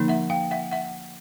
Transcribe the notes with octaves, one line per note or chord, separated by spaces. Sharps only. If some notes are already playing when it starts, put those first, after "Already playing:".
Already playing: D3 F3 A#3 D#4
E5 F#5
F5 G5
E5 F#5
E5 F#5